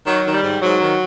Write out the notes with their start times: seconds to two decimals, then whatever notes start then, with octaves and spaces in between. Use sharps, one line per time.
0.06 D#3 F#3
0.24 D#3
0.34 G3
0.42 G#2
0.61 G#2 F#3
0.80 D#3